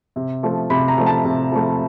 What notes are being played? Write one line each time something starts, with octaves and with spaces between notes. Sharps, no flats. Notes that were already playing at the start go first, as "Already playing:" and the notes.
C3
F3 A3
C3 B5
A#5
F3 A3
A5
C3
F3 A3